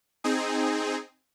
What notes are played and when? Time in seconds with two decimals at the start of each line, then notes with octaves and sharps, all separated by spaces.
0.24 C4 D#4 G#4